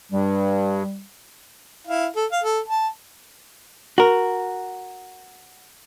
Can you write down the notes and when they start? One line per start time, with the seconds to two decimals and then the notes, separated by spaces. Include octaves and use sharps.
0.12 G2 G3
1.87 E4 F5
2.16 A4
2.32 F5
2.44 A4
2.68 A5
3.98 F#4 A#4